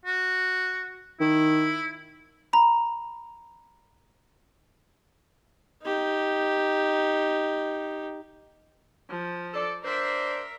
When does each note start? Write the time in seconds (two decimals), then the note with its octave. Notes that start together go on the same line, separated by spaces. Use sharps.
0.05 F#4
1.20 D#3 E4
2.53 A#5 B5
5.83 D#4 G4
9.10 F3
9.53 A4 D5
9.84 D4 A#4 C5 E5